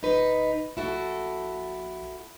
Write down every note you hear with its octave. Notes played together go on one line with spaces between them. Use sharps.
D1 D#4 B4
A#1 E4 F#4 A4